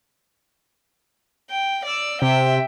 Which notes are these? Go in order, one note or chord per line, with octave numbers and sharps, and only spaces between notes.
G5
D5 E6
C3 E5 G5